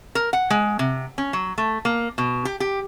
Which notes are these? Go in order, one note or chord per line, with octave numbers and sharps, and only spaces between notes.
A#4
F#5
G#3
C3
C#4
F#3
A3
A#3
B2
G4
G4